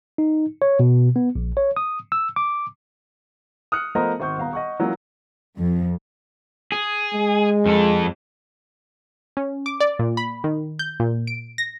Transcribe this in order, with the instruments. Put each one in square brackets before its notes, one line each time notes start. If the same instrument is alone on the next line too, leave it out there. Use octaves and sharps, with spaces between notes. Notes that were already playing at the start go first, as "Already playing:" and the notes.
[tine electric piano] D#4
C#5
B2
B3
A#1
C#5
D#6
E6
D6
[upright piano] D#6 F6 F#6 C#7
F3 A3 B3 A#4 C5 D#5
G#1 C5 C#6 G6
D#1 B3 F5 A#5
D#5 F#5 C#6
E3 F#3 A#3 C#4 F4 A#4
[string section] F2
[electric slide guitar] G#4
[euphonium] G#3
[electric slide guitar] F2 A4
[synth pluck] C#4
D6
D5
A#2
B5
D#3
G6
A#2
D7
A#6